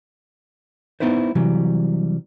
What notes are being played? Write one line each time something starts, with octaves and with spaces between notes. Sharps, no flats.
B3 D#4 E4 B4 C5
C3 E3 F#3 G3